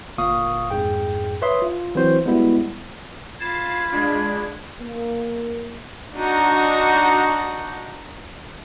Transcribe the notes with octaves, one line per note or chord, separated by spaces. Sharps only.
G1 A#2 F5 C#6 D#6
F2 G#2 G#4 G5
B4 C#5 E5 C6 D#6
F4
E3 F#3 C4 F#4 C5
G3 G#3 B3 E4 F#4
F4 B5 G#6 A6 C7 E7
G#3 D4
A#3
D4 D#4 F#4